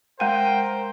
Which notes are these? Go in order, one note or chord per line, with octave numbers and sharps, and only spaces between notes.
G#3 A#4 C5 F#5 G5